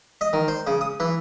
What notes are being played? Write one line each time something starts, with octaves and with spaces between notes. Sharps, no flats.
D#5
D#3
C5
C#3
D#6
E3